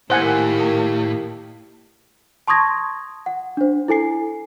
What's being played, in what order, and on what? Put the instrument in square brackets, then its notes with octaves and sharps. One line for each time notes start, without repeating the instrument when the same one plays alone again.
[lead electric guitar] A2 [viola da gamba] D#3 A#3 G4 [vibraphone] E4 [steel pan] C5 F#5 G#5
[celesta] A5 C6 C#6 D#6 G#6 A#6
F#5
D4 C5
E4 A4 G#5 C7